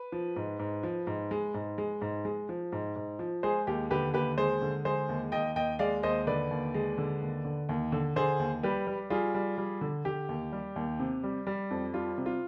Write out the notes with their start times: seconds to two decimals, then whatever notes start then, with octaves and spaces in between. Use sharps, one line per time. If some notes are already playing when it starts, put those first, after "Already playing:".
Already playing: B4
0.12 F3
0.36 G#2
0.59 G#2
0.83 F3
1.07 G#2
1.31 G#3
1.54 G#2
1.78 G#3
2.01 G#2
2.25 G#3
2.49 F3
2.72 G#2
2.96 G#2
3.19 F3
3.43 G#3 G#4 C5
3.67 D#2 G4
3.91 D3 G4 B4
4.14 D#2 G4 B4
4.38 G#3 G#4 C5
4.62 D3
4.85 G#3 G#4 C5
5.09 D#2
5.32 D#2 D#5 G5
5.56 D#2 D#5 G5
5.79 G#3 D5 F5
6.03 D#2 C5 D#5
6.27 D3 B4 D5
6.51 D#2
6.74 G#3
6.98 D3
7.22 D#2
7.45 D3
7.69 D#2
7.92 D3
8.16 D3 G#4 C5
8.39 D#2
8.63 G3 G4 B4
8.87 G3
9.10 G3 F4 G#4
9.34 G3
9.58 G3
9.81 D3
10.05 D3 G4
10.29 D#2
10.52 G3
10.76 D#2
10.99 C3
11.24 G3
11.47 G3
11.71 F2
11.94 G3 F4
12.18 C3
12.26 F4